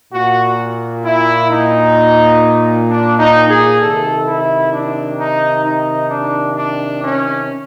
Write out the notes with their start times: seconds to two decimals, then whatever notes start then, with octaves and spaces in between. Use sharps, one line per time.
0.13 A#2 F#4
1.05 E4
1.51 D#4
2.89 D4
3.19 D#4
3.50 G#4
3.81 C3 D#3 A4
4.27 E4
4.73 D4
5.18 D#4
5.65 D#4
6.11 D4
6.57 D4
7.03 C#4